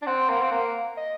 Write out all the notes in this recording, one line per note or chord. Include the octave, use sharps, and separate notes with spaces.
D4
C4 F#5
A#3
C4 F#5
A#3
D#5